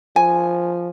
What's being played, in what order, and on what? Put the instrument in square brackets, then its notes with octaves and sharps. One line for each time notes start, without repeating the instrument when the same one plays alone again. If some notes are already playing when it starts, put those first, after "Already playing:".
[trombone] F3 [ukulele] G#5